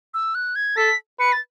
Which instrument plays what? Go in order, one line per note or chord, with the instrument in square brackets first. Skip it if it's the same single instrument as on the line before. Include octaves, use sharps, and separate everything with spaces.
[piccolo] E6
F#6
G#6
[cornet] A4 [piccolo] B6
[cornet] B4 [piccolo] C#7
[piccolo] A6